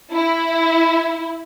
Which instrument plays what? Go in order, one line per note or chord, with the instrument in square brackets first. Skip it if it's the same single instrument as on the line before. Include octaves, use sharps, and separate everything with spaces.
[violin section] E4